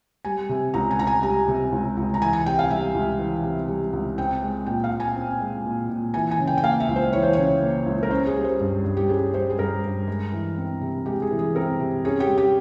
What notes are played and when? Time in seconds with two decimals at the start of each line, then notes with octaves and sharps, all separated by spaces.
0.25 G3 G#5
0.49 C3
0.74 C#2 A#5
0.91 G#5
0.98 C#2 A#5
1.07 G#5
1.23 G3 A#5
1.48 C3
1.72 C#2
1.97 C#2
2.14 A#5
2.21 E3 G#5
2.33 G#5
2.46 C3 G5
2.59 F5
2.71 G3 E5
2.94 C#2
3.19 E3
3.43 C3
3.68 G3
3.93 C#2
4.18 C4 G5
4.43 G#3
4.66 A#2 G5
4.84 F5
4.92 A#2
5.00 G#5
5.16 C4
5.40 G#3
5.66 A#2
5.89 A#2
6.14 E3 G#5
6.31 G#5
6.39 C#3
6.47 G5
6.58 G5
6.63 A#3 F5
6.80 E5
6.88 C#2
6.96 C5
7.13 E3 C#5
7.23 C5
7.33 C#3 C#5
7.62 A#3
7.86 C#2
8.03 A#4
8.11 C#4 C5
8.27 G#4
8.36 G3
8.44 C5
8.60 G2
8.84 G2
8.97 G4
9.09 C#4 G#4
9.33 G3 C5
9.50 G#4
9.58 G2 A#4
9.84 G2
10.07 G#3
10.32 E3
10.57 C4
10.81 C3
11.06 G#3 G4
11.22 G#4
11.31 E3
11.39 G#4
11.55 C4 A#4
11.80 C3
12.05 C#4 G#4
12.20 G4
12.28 G3
12.38 G4